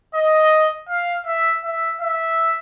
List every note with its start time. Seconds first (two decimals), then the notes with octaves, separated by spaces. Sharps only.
0.15 D#5
0.89 F5
1.27 E5
1.64 E5
2.01 E5